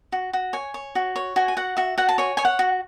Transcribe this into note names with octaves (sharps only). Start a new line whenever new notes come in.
F#4
F#4
C#5 G#5
C#5
F#4
C#5
F#4 G#5
G#5
F#4 F#5
F#4 E5
F#4 F#5
A5
C#5 G#5
C#5 G#5
F#5
F#4